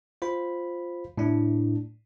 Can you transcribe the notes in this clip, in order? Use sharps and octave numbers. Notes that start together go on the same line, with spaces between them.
F4 C5 B5
A2 D4